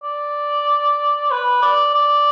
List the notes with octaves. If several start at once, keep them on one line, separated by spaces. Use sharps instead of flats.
D5
B4
D5
D5